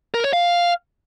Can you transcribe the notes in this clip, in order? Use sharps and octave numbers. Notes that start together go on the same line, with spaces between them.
A#4
C#5
F5